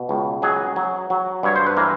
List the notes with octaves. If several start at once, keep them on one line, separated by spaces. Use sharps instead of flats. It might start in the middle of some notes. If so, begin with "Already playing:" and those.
Already playing: B2
C#2
F#3 G#4
F#3
F#3
G2 C#5
C5
B4
E3 A#4